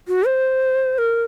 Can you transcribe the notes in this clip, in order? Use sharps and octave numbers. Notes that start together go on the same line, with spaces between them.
F#4
C5
A#4